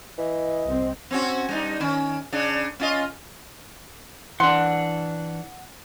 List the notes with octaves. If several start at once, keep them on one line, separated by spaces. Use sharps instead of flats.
E3 D#5
C2 C4
C4 C#4 F#4
G3 D4 D#4
D#3 C#4
C#3 D4
C#4 F4 D#5
E3 D4 F#5 C6